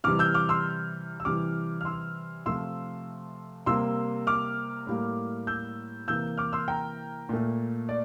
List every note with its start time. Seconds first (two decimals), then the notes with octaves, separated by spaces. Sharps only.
0.04 C3 E3 G3 D6 F6
0.19 E6 G6
0.34 D6 F6
0.49 C6 E6
1.20 E6
1.25 C3 E3 G3 D6 F6
1.81 F6
1.85 C6 E6
2.46 C3 F3 A3 C6 E6
3.66 C3 G3 A#3 C6 E6
4.27 D6 F6
4.87 A2 G3 A#3
5.47 E6 G6
6.08 C3 E3 A#3 E6 G6
6.37 D6 F6
6.53 C6 E6
6.68 G5 A#5
7.29 A#2 A3
7.89 D5